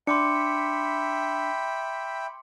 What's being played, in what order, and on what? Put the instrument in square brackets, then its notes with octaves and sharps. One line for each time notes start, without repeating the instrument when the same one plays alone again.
[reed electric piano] D4 [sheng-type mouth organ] E5 G5 B5 [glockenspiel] C6 D6 C#7